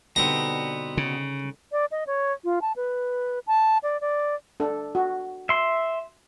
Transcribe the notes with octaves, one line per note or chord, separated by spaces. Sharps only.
B2 D3 G3 B3 C4 D#4 A#5
C#3
D5
D#5
C#5
F4
A5
B4
A5
D5
D5
D4 A4
F#4
E5 C6